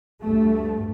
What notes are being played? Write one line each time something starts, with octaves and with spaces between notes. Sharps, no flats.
D2 G2 A3